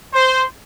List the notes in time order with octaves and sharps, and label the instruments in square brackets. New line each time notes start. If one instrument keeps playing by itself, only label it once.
[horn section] C5